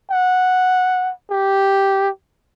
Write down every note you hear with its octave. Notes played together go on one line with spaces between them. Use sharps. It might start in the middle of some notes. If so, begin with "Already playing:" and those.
F#5
G4